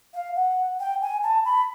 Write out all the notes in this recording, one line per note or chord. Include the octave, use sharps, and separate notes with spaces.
F5
F#5
G5
G#5
A5
B5